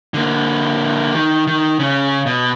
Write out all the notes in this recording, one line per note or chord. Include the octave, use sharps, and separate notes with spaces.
D3 A#3
D#3
D#3
C#3 C#4
B2